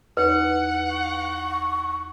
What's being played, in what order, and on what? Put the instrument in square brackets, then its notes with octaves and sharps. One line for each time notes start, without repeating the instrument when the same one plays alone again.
[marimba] E2 D#4 [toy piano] B4 [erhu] F#5
[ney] C#6